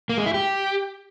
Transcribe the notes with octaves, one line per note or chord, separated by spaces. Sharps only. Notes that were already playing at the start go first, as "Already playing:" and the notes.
A#3
G#3
E4
G4